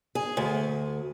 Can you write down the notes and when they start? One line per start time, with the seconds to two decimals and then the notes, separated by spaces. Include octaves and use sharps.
0.15 G#4
0.37 D2